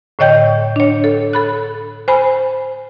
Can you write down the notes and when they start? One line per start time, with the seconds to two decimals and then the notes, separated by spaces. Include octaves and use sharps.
0.19 A2 D3 C#5 D#5 G5 G6
0.76 D4 C#5
1.04 A4
1.33 A4 B5 F#6
2.08 C5 G#5 B5